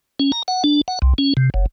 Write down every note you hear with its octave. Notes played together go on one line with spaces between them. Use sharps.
C#4
A#5
F#5
D4
F#5
C2
C#4
C3
F#1